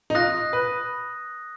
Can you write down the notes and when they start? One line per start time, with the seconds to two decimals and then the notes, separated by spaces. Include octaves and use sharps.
0.10 D#4
0.15 F4 D#6 F#6 A#6
0.53 B4